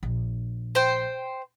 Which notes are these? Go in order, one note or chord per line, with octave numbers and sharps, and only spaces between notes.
A#1
C5 G5